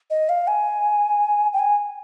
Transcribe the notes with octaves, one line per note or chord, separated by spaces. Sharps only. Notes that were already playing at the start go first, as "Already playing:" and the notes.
D#5
F5
G#5
G5
G#5